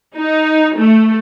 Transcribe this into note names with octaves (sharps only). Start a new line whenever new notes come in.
D#4
A3